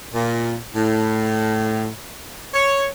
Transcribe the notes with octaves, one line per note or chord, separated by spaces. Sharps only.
A#2
A2
C#5